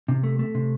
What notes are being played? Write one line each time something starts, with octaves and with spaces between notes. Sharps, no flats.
C3
A3
A3
C3